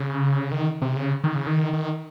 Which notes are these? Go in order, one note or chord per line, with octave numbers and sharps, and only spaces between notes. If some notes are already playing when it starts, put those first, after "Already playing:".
Already playing: C#3
D#3
C3
C#3
D#3
C#3
D#3
D#3